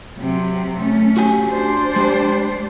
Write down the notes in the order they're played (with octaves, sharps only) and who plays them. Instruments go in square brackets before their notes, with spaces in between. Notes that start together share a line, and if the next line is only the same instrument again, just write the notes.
[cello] C3 F#3
A3 C#4
[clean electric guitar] F#4 G4 G#5
[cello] D4 C5
[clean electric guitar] G#3 G4